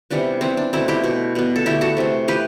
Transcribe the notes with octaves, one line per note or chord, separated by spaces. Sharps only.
C3 E3 G3 B3 D4
E3 B3 C4
D4
B2 A3 C4 E4
E4 G4
B2 A3
B2 G3 B3
A4
D3 A3 E4 G4
F#4 A4
C3 E3 A3
E3 G4 B4